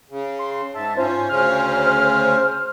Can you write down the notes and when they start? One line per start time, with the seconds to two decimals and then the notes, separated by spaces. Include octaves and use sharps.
0.10 C#3
0.39 C6
0.75 G#2 E5 A5
0.97 G#2 C#4 F4 C5
1.29 D2 C#3 C#4 F6